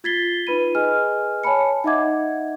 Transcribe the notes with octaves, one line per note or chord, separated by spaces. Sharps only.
F4 G#6 A6 B6 C7 G7
D#4 F4 B4 B5 D#7
G#4 B4 D#5 G#5 F6
C#5 G#5 A5 B5 C#7
D#4 D#5 E5 F#5 D6 G#6